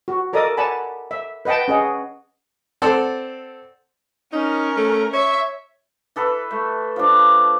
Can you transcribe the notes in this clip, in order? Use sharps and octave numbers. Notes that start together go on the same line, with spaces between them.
F#4
A4 A#4 D5 D#5 D#6
D5 F#5 G#5 A5 B5
E5
B4 D#5 F#5 G5 A5
C#4 G#4 D#5 F#5
C4 A4 D5 F#5 C6
C#4 D#4 A#4
A3
C#5 E5
E3 A4 B4
A3
F3 D4